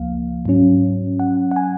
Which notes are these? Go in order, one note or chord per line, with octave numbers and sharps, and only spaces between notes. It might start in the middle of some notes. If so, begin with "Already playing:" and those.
Already playing: C#2 F3 A#3 F5
G#2 F#3 C#4
F#5
F#5
G#5